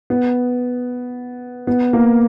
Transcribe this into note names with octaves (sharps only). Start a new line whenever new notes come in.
B3
B3
A#3